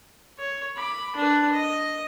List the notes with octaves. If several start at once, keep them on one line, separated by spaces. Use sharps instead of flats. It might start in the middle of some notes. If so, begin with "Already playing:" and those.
C#5
B5 D6
D4 B4
D#5